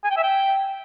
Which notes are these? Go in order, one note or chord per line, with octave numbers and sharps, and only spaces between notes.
G#5
G5
E5
G5